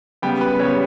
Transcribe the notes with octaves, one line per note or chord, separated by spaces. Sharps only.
C#3 G3 B3 G5
B4
C#3 G3 B3 C#5